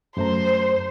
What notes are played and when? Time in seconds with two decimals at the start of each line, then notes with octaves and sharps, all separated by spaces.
0.17 F#2 A3 C5 A#5